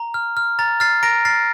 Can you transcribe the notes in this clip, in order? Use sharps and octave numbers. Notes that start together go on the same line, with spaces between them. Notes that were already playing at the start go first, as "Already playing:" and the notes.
Already playing: A#5
F6
F6
A#5 A6
F6 A6 C7
A#5 A#6 D7
F6 A6 C7